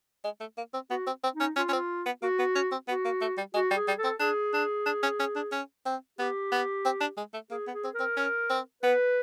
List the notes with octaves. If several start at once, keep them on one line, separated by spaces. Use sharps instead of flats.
G#3
A3
A#3
C4
B3 F#4
C4
C4
D#4
C#4
C#4 F4
C#4
C4
B3
A#3 F#4
B3
C#4
C4
B3 F#4
A#3
A3
G3
G#3 F#4
G3
G#4
G3
A4
C4
D4 G#4
D4
D4
C#4
C#4
D4
C#4
C4
B3 G4
B3
C4
D4
G#3
A3
A#3 G#4
B3
G#4
C4
A#4
C4
C#4
C4
B3 B4